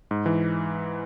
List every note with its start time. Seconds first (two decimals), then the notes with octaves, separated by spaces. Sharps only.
0.11 G#2
0.26 E3